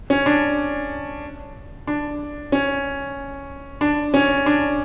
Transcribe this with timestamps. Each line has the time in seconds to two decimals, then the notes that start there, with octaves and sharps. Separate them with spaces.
0.10 C#4
0.26 D4
1.87 D4
2.52 C#4
3.81 D4
4.14 C#4
4.46 D4